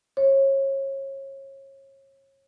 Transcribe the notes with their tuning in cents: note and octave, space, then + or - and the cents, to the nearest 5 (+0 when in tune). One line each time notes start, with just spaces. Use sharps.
C#5 -30